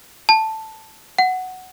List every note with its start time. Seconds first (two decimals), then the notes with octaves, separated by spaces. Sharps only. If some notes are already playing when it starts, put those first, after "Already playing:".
0.29 A5
1.18 F#5